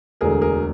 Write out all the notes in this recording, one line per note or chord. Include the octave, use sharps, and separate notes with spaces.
E1 D2 D3 G#4 A#4
G#4 A#4